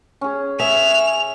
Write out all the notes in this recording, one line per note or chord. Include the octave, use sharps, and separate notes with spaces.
C#4 G#4
G#4 E5 F7